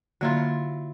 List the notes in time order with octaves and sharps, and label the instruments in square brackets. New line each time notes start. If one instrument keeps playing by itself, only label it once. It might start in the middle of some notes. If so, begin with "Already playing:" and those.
[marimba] D3 A#3 [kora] F#3 E4 F4